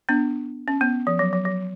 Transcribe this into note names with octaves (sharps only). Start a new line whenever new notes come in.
B3 D4
C#4
B3
F3
F#3
F#3
F#3